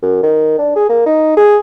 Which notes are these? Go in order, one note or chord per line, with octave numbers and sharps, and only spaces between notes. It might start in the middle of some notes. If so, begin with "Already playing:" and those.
F#2
D#3
D4
G#4
A#3
D#4
G#4